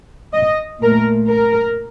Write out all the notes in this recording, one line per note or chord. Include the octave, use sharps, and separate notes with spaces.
D#5
A#2 A3 A#4
A#4